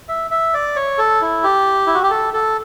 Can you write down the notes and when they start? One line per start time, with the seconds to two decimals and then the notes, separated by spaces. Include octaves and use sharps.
0.08 E5
0.31 E5
0.54 D5
0.76 C#5
0.98 A4
1.21 E4
1.44 G4
1.87 E4
1.94 F#4
2.03 G4
2.10 A4
2.34 A4